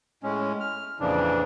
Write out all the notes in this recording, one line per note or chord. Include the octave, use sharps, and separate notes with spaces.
A2 G#3 C#4
F6
F2 A#2 C#3 E3 F3 D4